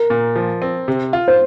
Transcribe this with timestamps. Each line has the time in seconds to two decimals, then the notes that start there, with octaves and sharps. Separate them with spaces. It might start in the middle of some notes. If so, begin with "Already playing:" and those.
Already playing: A#4
0.10 A#2
0.36 F3
0.62 C4
0.88 C3
1.13 F4
1.28 C5